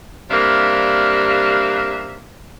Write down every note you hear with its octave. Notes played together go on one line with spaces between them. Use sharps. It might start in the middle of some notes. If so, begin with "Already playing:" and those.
C3 G3 A#3 D4 E5 F5